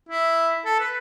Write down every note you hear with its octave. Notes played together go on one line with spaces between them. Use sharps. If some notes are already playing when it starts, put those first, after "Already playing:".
E4
A4
B4